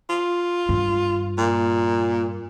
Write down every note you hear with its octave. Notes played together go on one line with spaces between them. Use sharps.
F4
G2
A#2